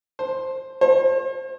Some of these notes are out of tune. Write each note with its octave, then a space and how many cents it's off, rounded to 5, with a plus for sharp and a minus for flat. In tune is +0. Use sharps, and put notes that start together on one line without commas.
C5 +10
C5 +45